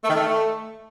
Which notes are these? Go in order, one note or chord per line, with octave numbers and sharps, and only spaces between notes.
A3
D#3
A3